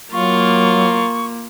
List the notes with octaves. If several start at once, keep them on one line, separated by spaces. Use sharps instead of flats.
F#3 A#3 F4 A#4 C#6